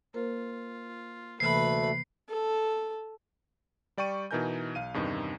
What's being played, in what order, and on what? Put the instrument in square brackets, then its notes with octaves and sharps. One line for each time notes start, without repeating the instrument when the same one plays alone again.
[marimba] A#3 A#4 C5 [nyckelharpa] F4
[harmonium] D2 A3 [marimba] C3 E3 A#3 [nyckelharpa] B4 B5 [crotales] C7
[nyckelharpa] A4
[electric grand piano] G3 D5 G5 C#6 D#7
B2 E3 D#4 A#4 G#5 G6
B1 F5 D#7
E2 G2 C3 D#3 D#4